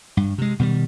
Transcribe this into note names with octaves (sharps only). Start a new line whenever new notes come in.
G2
C3 G#3
B2 D#3 F#3 G3